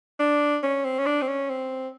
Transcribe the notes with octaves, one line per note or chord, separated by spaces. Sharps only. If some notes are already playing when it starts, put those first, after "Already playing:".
D4
C#4
C4
C#4
D4
C4
C#4
C4